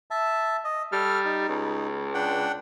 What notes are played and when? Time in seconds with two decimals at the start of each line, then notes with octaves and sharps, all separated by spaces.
0.11 E5 A5
0.64 D#5
0.92 G3 A4 F6
1.25 D#4
1.49 C#2
2.14 D4 F#5 G5